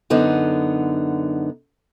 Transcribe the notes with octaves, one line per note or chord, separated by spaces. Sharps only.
F#2 D3 B3 D#4